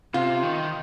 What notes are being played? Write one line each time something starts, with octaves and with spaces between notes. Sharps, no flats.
C3 F4
D#3